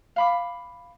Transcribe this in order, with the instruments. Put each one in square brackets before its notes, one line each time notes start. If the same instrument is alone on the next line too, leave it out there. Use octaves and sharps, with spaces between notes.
[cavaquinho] F5 B5 D6